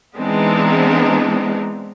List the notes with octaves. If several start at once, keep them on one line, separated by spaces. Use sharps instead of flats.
E3 G#3 B3 C4 D4 D#4